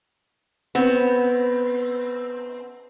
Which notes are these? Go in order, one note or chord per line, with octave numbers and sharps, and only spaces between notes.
B3 C4